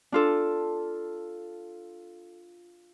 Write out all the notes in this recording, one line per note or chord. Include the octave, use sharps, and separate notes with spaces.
D4 F4 A4